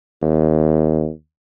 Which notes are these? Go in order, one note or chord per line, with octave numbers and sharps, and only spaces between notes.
D#2